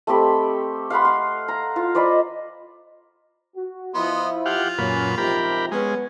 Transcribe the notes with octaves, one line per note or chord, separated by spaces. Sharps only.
A3 C4 G4 B5
F5 F#5 B5 C6
C6
A#5
F4 F5
C5 D5 D#5 B5
F#4
F3 B3 E4 D#5 C6
F4 G4 F5 F#5
F#2 A#2 C#4 B4
G#2 C3 F3 G4 A#4 B5
G#3 B3 C#4